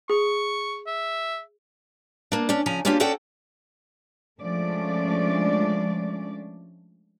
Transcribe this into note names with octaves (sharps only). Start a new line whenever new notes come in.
G#4 C#6
E5
A#3 D4
C#4 D4 D5
C#3 F3 G#5 A#5
F#3 A#3 C#4 D4 F4 G4
C#4 F#4 A4 D5 F#5 G5
F3 G#3 A3 C#4 D4 D5